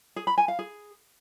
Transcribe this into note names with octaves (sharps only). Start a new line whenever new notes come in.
G#4
B5
G#5
F5
G#4